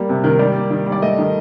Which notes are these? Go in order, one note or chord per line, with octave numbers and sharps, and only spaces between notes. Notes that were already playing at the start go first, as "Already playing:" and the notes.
Already playing: G3 A#3
C3
D#3
G3 D5
A#3
D#3
G3
D5
A3 D#5
D#3